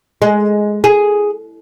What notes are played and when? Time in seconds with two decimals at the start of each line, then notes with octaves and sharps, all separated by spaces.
0.22 G#3
0.84 G#4